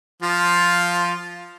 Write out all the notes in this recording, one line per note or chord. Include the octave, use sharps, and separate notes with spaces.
F3 F4